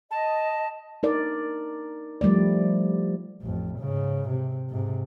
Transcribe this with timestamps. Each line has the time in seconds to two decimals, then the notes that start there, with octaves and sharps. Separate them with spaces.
0.11 D#5 A5
1.03 D#4 A#4 D5
2.21 F3 G3 A3 D5
3.43 A1 F2
3.78 G#2 C#3
4.29 C3
4.70 G#2 C3